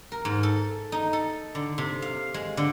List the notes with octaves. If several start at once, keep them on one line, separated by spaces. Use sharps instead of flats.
A#4
G#2
A4
D#4
A4
D3
C3
F5
G#3
D3